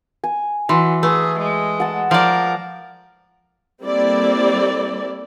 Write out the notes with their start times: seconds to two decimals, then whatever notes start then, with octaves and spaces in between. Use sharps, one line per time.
0.24 G#5
0.69 E3 F#3 C6
1.03 A3 G#4 B4
1.39 G#3
1.80 F#5 A5
2.11 F3 A#4 D5
3.82 G3 A#3 C4 E4 A4 D5